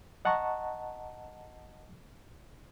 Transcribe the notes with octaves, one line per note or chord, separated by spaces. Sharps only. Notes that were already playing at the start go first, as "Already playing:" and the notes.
D#5 F#5 A5 A#5 C#6